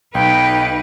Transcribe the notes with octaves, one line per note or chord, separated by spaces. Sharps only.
B1 D#4 B4 G5